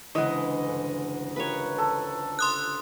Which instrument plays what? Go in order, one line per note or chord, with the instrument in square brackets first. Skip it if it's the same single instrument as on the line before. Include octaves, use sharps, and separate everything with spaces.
[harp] D2 C#3 [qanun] E3 G#3 [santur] D#5 F#5
[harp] G1
[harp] F4 G4 A#4 [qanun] B4 C#5
[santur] A4
[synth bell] C6 D#6 F#6